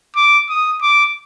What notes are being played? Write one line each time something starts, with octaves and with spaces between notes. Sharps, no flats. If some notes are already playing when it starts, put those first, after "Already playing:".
D6
D#6
D6